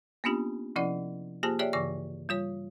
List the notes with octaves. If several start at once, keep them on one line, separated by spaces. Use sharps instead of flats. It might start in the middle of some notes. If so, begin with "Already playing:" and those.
A#3 B3 C#4 D4 F4 G4
C3 F3 C#4 E4 D5 F#5
A#3 F4 G4 G#4 C5 A5
G4 G#4 C#5 D5 E5 G5
G2 C#3 E3 D5 C#6 A#6
G3 F4 C#5